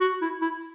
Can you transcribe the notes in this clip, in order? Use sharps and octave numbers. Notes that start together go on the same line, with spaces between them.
F#4
E4
E4